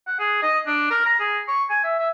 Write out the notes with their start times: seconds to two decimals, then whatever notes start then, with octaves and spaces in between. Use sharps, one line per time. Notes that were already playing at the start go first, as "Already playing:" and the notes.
0.07 F#5
0.19 G#4
0.43 D#5
0.67 D4
0.91 A#4
1.06 A#5
1.20 G#4
1.48 C#6
1.70 G#5
1.84 E5
2.00 E5